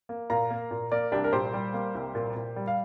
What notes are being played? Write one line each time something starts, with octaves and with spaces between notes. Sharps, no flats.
A#3
A#2 F5 A#5
A#3
A#2
A#3 A#4 D5
C2 D4 G4
A#4
A#2 G4 C5
G3
A#3
C2
A#2
A#2
G3
F5